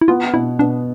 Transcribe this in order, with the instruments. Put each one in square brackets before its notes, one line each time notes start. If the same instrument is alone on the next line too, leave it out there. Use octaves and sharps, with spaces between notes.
[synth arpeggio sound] E4
[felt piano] B3 [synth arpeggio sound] F4
[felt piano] B2 [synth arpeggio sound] E4
[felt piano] B2 [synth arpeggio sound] D4